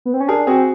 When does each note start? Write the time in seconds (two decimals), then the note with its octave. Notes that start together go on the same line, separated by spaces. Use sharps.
0.05 B3
0.14 C4
0.20 C#4
0.28 D4 G#4 A#4
0.47 C4 F#4 G#4